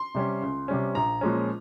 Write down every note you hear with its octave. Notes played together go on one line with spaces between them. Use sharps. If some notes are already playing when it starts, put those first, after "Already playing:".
Already playing: C6
C3 G3 C#4
C#2
C3 G3 C#4
A#1 A#5
A#2 F3 G#3 C#4